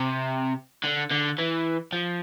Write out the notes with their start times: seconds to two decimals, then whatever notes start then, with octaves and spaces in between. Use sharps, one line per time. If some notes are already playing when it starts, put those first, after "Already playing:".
Already playing: C3
0.84 D3
1.12 D3
1.39 E3
1.93 F3